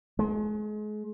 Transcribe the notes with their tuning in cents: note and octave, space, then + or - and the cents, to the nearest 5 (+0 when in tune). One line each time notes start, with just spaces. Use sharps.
G#3 +35